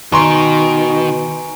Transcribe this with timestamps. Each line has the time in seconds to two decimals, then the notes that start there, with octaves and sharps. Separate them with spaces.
0.12 B2 D#3 G#5 A#5 C6 C#6 D7